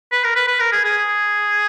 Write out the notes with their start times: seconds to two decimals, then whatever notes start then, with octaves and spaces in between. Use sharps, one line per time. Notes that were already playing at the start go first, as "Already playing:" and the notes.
0.12 B4
0.24 A#4
0.35 B4
0.48 B4
0.60 A#4
0.72 G#4
0.84 G#4